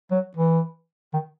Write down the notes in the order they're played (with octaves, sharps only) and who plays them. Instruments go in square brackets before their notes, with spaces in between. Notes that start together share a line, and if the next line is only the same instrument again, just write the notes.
[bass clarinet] F#3
E3
D#3